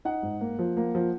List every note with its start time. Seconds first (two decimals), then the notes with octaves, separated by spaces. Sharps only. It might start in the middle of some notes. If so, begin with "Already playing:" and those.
0.05 D#4 F#5
0.23 G#2
0.41 A#3
0.59 F3
0.77 A#3
0.95 F3